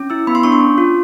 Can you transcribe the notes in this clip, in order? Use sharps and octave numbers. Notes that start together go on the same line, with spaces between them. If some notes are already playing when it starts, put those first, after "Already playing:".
Already playing: C#4
E4 E6
B3 B5
C6
D4 C#6
C6
C#4
F4